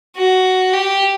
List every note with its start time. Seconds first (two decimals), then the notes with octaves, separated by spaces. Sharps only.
0.17 F#4
0.74 G4